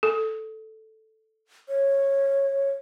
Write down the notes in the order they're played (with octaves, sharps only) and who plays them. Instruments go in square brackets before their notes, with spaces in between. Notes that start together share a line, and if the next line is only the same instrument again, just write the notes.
[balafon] A4
[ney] C#5